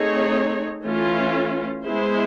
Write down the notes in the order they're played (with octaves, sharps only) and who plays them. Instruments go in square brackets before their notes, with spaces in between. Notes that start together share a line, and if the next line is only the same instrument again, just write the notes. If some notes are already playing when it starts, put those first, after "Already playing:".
Already playing: [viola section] A3 C4 D#4 G#4 C#5
E3 A3 C#4 F4
G#3 B3 E4 G#4 C5